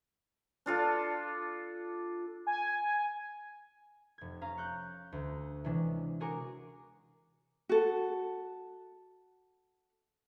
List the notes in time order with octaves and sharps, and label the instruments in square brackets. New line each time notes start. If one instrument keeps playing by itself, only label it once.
[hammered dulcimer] D4 F4 A4
[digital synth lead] G#5
[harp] F1 G#6
C#4 F5 A#5
C#6 F#6 G6
D2
C3 E3 G#3 B3 C#4 D4
F#4 G#4 A#4 G#5 C#6 D6
[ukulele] F#4 A4